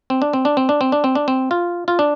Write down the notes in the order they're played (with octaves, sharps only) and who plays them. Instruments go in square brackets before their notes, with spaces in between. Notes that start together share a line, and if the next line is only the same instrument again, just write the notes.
[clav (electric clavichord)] C4
D4
C4
D4
C4
D4
C4
D4
C4
D4
C4
F4
F4
D4